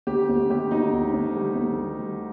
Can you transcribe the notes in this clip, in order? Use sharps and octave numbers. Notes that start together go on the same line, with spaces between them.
D2 G4
D2
D2 G4
D2 D#4
D2
D2
G3
D2
G3
G3